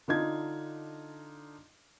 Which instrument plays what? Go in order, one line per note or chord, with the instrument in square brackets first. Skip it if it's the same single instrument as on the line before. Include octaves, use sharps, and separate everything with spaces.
[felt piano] D3 D4 D#4 F4 D#5 G#6